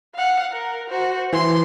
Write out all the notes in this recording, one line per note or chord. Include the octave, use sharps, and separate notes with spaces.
F5 F#5
A#4
F#4 C5
E3 C6